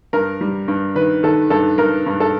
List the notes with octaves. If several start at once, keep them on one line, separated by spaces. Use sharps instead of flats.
G2 A#4
G3
G2
D#3 B4
D#3 A4
G2 A4
G2 A#4
G2
A4